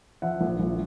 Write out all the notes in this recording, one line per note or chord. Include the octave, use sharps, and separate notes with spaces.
F3 E5 F#5
A#1
A#1